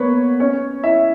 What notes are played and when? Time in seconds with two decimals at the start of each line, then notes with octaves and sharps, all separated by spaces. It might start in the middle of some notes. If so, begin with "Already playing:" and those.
Already playing: A#3 B3 B4 C#5
0.40 C#4 C#5
0.83 E4 E5